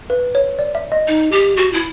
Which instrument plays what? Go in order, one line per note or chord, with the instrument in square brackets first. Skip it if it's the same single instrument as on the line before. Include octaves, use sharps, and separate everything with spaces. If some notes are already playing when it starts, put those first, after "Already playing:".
[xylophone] B4
C#5
D5
E5
D#5
[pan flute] D#4
G4
F#4
E4